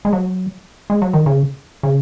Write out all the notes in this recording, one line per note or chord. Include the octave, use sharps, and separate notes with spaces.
G#3
F#3
G#3
F#3
D#3
C#3
C#3